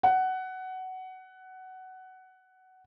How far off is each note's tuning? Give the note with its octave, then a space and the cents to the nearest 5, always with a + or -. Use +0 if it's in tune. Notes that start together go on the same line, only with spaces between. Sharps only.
F#5 +15